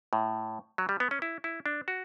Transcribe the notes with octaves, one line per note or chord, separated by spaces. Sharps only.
A2
F#3
G3
B3
C#4
E4
E4
D4
F#4